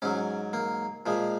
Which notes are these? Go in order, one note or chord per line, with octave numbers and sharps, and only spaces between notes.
G#2 F#3 C#4
A#3
A#2 F3 G#3